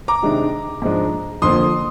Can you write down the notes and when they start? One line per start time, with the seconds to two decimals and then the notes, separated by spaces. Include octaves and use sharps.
0.08 A#5 D6
0.23 C3 D#3 G#3 D4
0.82 G#2 F3 G#3 D4
1.42 F2 D3 F3 A#3 C6 D#6